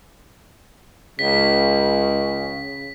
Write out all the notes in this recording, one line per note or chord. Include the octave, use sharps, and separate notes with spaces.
C#2 C#3 B6